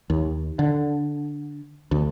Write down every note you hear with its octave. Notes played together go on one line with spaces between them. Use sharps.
D#2
D3
D2